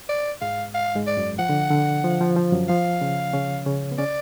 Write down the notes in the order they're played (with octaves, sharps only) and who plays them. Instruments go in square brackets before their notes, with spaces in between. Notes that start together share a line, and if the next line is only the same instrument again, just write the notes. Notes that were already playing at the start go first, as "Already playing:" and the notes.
[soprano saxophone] D5
[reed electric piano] G#2 G#3 [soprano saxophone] F5
[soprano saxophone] F5
[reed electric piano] G#2 G#3
[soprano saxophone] D5
[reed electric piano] F#2 F#3
[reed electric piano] F3 [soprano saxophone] F#5
[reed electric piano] D3
D3
F3
F3
F3
F#2 F#3
[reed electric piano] F3 [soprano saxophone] F5
[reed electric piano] C#3 C#4
C#3 C#4
C#3 C#4
B3
[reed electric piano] C#3 C#4 [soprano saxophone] D5